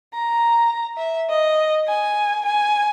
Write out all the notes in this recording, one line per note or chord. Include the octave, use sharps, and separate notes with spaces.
A#5
E5
D#5
G#5
G#5